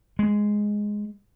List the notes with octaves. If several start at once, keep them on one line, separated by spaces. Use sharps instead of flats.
G#3